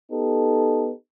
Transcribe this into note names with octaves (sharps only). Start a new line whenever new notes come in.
B3 D#4 G4 A4